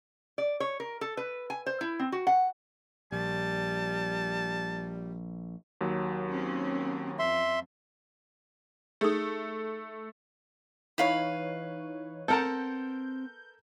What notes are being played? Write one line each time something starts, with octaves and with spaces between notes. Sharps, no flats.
D5
C#5
A#4
A4
B4
G#5
C5
E4
C4
F#4
F#5
A#1 G3 A5
D#2 F#3
C4 C#4
F2 E5 C6
A3 D#4 G#4
E3 D#4 B4 C#5 F5 B5
C4 A4 A#4 F#5 A5 G6